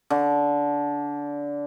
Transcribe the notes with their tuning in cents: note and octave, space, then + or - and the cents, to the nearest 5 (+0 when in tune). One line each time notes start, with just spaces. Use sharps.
D3 -20